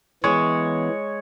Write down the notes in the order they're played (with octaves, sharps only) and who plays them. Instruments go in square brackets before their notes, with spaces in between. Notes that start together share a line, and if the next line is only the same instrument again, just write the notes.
[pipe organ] E3 B3 [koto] G#3 [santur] C#5